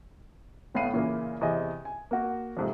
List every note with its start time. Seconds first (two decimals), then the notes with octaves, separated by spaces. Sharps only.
0.75 G1 A2 B3 F5 C7 D#7
0.94 A#2 C#3 E3 A#3
1.41 E2 C3 G#4 D#5 G#5
1.85 G#5
2.11 A#3 F#4
2.57 F2 G#2 C3